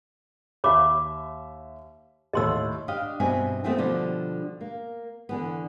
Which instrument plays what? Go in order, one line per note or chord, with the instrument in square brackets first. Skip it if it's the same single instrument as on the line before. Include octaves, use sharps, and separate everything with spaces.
[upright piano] D#2 E5 [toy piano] C#5 B5 D6
[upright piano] D#2 A2 [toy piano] D#5 C6 E6
[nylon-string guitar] D4 G4 D#5 F5
G2 B2 C4 E5 G#5
A3 B3 C4 F4 E5 G5
B2 D3 F3 G3 G4
A#3
D3 E3 B3